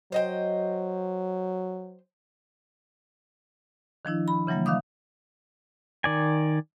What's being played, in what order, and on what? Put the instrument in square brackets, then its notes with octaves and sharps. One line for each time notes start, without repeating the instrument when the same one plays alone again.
[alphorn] F#3 [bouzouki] C5 D#5 G5
[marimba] D#3 F3 D4 E4
B5
C#3 E3 F#3 G3 A#3
D#3 E5 F5 D6 D#6 G6
[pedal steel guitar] D#3 D5 G#5